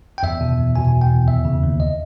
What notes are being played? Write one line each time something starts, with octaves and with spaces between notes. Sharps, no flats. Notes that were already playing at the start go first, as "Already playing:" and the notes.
G5
E2 E5
B2
E2
B2 G#5
B2
G5
E2
D#2 E5
C#3
D#2
D#5